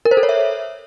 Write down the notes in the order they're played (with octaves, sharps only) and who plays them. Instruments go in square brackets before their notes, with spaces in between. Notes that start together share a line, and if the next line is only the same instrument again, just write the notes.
[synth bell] A#4
C5
A4
C#5
E5